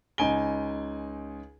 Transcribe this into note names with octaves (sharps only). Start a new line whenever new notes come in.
C#2 D#4 G#5 D7 G7